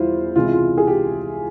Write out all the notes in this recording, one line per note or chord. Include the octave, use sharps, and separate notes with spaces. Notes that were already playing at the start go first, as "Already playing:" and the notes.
Already playing: E2 E3 G3 E4 F4 C5
C#2 C3 E3 G#3 F4
E4
F4
G#4
G4